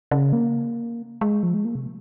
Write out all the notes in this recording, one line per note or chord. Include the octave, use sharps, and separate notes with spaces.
C#3
A#3
G#3
F3
G#3
A#3
C3